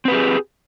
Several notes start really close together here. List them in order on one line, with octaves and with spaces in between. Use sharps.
C4 B4 G4 G#4